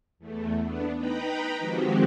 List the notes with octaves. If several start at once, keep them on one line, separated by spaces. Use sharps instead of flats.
E2 A3
B3 D4
D#4 B4 G5 A#5 B5
D#3 F3 G#3 C4 F#4 G4